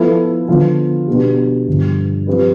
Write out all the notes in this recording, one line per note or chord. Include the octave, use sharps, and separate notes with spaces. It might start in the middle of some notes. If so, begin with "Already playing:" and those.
Already playing: F3 B3 E4 A4
D3 F3 B3 F4
B2 B3 D4 G4
G2 D3 F3
F3 C4 G4 B4